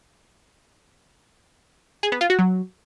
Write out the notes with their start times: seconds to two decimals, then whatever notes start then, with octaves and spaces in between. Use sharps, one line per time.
2.03 G#4
2.12 B3
2.21 F4
2.30 F#4
2.39 F#3